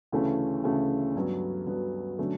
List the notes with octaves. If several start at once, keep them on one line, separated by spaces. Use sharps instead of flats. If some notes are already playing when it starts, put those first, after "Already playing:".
D2 C#3 E3 A3 C#4
D2 C#3 E3 A3 C#4
G2 F#3 B3
G2 F#3 B3
D3 F#3 A3 C#4